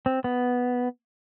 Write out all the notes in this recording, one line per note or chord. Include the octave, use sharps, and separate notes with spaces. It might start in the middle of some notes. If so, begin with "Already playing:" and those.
C4
B3